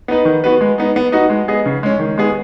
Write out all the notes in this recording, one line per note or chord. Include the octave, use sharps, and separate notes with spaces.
B3 D#4 B4
D#3
B3 F#4 B4
G#3
B3 D#4
B3
D#4 F#4 B4 D#5
G#3
B3 G#4 D#5
C#3
G#3 C#4
D#3
G#3 B3 G#4